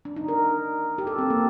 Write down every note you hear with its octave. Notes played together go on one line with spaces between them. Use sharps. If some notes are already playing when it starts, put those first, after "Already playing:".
D4
D#4
A#4
G4
A4
C4
A#3